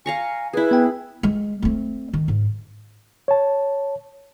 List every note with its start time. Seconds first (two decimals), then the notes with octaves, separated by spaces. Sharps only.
0.06 F5 G#5 A#5 C#6
0.53 E4 G#4 B4
0.71 B3 G5
1.23 G#3
1.62 A3 C4
2.13 D#3
2.28 G#2
3.28 C#5 A5